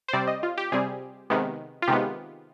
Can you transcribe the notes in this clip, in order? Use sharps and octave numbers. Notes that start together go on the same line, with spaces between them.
C5
C3 G3 C4 D5
D#5
F4
G4
C3 G3 C4 G#4
C3 D#3 G#3 B3
F4
C3 D#3 G#3 B3 G4